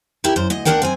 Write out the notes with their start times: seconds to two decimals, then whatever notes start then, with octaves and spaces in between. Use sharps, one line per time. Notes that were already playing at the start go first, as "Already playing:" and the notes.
0.24 E4 G4 A#4
0.36 F#2 C5
0.50 D2 D#5
0.65 D2 E3 D4 A#4 F#5 G5
0.82 F#2 C4 G#5